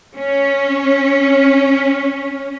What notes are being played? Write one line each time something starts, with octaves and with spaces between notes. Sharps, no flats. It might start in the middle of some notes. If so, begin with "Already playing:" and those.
C#4